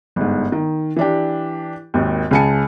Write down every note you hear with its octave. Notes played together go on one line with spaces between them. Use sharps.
G1 G#2
D#3
E3 D4 G4
G#1 D#2
C#2 C#3 G#5 A5 C#7